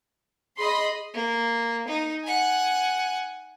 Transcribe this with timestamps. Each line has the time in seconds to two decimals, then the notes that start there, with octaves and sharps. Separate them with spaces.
0.58 G#4 D#5 B5 C6
1.14 A#3
1.88 D#4
2.24 F#5 G#5